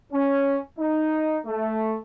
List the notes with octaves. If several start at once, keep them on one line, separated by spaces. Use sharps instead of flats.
C#4
D#4
A3